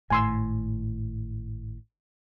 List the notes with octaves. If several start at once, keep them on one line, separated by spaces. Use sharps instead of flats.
G#1 A2 G#5 C6 E6